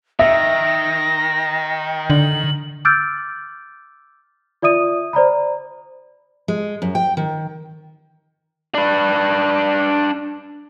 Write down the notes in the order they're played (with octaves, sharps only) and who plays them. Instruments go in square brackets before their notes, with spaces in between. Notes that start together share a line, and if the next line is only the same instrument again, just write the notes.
[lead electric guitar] D#3 [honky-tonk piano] E5 [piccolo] A#6
[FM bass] D3 [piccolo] F#7
[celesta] D6 E6 F6 G6 A6 D7
F4 D5 E5 D#6 D#7
C5 D5 A#5 B5
[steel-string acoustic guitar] G#3
F#2
G5
D#3
[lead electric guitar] D4 B4